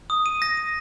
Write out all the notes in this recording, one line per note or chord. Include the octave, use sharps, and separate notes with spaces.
D#6
D#7
A#6
D#7